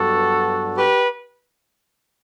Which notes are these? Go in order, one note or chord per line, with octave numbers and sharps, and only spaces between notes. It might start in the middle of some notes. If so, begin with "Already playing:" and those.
Already playing: G2 F#3 B3 D4 F#4 A4
G4 B4